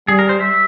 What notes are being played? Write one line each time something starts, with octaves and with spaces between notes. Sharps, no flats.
G3 G#4
A#4
C5
E5